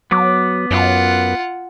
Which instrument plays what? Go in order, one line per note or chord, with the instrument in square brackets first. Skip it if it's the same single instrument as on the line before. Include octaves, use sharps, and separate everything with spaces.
[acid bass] F#3 [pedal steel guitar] B3 D6
[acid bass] F#2 [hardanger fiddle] F4 F#5